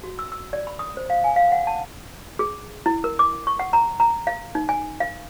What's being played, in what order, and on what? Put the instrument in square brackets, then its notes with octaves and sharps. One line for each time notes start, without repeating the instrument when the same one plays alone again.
[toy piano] F#4
E6
E6
D5
B5
D#6
C5
F5
G#5
F5
F#5
A5
G#4
E4
A#4
D6
C#6
F#5
A#5
A#5
F5
D#4
G#5
F5